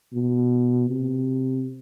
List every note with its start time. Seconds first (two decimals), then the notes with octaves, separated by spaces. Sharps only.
0.13 B2
0.90 C3